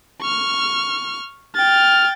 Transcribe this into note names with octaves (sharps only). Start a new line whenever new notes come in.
C#6 F6
G5 F6 A6